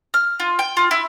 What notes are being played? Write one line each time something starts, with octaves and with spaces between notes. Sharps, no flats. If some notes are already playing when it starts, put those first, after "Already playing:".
F6
F4
G5
F4
E4